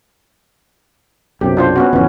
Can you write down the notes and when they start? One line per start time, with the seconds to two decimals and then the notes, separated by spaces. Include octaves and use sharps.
1.41 B1 F#2 C3 G4
1.57 D4 F4 C5
1.76 B3 C#4 F#4
1.93 D1 F2 E3 B3 C#4